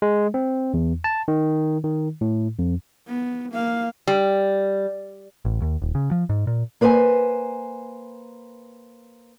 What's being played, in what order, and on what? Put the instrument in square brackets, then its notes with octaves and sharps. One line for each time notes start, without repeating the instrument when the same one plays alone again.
[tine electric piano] G#3
C4
E2
A5
D#3
D#3
A2
F2
[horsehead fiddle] B3
A#3 F5
[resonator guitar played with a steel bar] G3
[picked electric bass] A1
D#2
D#1
C#3
F3
G#2
A#2
[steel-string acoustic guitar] A#3 B4 C5 D#5 G#5